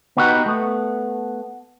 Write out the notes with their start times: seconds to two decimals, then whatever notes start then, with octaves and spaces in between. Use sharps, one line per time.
0.17 B3 D#4 F#4 G4 A4 B4
0.46 A3 B3